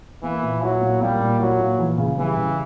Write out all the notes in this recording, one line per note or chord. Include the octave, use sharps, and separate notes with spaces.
E3 A#3
A#2
F#3 E4
A#2
G3 A#3
A#2
F#3 E4
A#2
E3
C#3
E3 G3
C#3